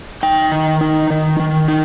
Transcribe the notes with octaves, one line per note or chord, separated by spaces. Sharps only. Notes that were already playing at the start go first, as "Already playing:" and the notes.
D#4 G5
D#3
D#4
D#3
D#3
D#4